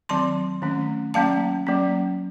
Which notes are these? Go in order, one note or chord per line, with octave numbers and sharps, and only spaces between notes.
D#3 F#3 C4 A5 C6
D#3 A3 C#4
F#3 A#3 C#4 F5 A5
F#3 A#3 C#4